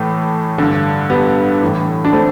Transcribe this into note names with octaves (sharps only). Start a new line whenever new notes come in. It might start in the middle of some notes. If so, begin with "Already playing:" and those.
Already playing: A2 E3 A3
G2 D3
G3 B3
A2 E3
D4
A3 C4